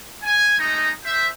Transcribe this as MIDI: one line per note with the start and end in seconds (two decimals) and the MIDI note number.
0.23 0.57 80
0.59 0.89 56
0.59 0.89 57
0.59 0.89 63
0.59 0.89 75
0.59 0.89 82
1.04 1.27 72
1.04 1.27 76